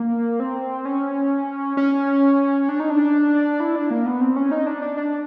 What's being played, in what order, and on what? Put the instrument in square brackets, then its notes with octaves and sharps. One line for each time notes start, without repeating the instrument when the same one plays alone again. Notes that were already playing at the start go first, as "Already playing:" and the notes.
Already playing: [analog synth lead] A#3
C4
C#4
C#4
D4
D#4
D4
E4
D4
A#3
B3
C4
C#4
D#4
D4
D4
D4